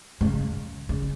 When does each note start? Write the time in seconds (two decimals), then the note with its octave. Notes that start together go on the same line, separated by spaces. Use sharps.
0.21 C#3
0.89 C#3